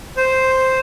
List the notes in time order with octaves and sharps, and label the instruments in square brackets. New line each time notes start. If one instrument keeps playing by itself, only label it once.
[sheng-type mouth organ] C5